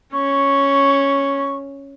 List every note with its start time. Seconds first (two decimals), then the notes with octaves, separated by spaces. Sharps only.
0.13 C#4 C#6